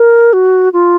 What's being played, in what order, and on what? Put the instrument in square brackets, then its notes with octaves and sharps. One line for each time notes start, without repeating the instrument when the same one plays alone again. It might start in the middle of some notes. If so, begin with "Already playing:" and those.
Already playing: [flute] A#4
F#4
F4